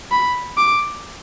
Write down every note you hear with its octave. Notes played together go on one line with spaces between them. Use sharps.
B5
D6